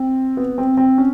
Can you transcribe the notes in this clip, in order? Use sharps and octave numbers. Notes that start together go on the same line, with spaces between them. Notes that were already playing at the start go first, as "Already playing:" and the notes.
Already playing: C4
B3
C4
C4
C#4